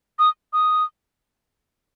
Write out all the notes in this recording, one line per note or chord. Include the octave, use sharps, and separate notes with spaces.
D#6
D#6